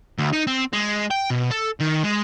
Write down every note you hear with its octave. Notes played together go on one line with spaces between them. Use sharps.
D2
D#4
C4
G#3
G5
B2
A4
D#3
G#3